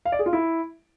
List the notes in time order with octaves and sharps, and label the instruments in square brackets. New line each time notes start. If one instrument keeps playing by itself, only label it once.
[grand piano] F5
D5
G#4
F4
E4